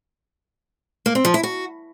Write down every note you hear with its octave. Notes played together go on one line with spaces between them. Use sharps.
A#3
C4
F3
E4
F#4